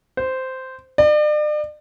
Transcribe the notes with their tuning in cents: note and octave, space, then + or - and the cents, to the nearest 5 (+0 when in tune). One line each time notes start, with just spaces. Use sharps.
C5 -10
D5 +40